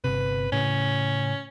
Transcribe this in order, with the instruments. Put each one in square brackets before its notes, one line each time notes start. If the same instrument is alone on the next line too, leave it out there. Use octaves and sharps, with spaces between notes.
[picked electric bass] G1 C3 [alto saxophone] B4
[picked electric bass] A2 C#3 [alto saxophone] C#4